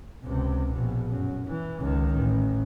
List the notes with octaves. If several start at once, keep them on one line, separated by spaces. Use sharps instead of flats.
C#2 C3
A#1 B2
F#2
E3
C#2 D#3
A1